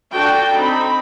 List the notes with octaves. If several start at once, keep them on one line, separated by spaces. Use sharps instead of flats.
D4 F#4 A4 G5 A5
C4 D#4 B5